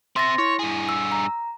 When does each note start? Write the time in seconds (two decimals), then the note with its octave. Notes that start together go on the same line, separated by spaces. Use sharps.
0.16 C4 E5 C6 A6 A#6
0.38 E4 C#5
0.59 G2 G#4
0.89 E6
1.12 A#5